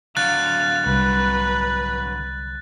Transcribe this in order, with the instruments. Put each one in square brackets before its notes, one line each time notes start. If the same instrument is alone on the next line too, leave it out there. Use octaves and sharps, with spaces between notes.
[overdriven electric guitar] D3 F#3 [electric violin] F5 [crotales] F#6 A6
[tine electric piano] C2 [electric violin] B4